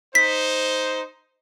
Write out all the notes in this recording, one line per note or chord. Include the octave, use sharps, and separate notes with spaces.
D#4 C5 B6